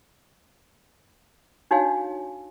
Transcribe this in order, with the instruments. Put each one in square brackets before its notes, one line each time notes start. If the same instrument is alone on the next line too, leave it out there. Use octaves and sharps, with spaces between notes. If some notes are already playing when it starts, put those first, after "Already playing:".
[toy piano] D4 D#4 F#4 C#5 F5 G#5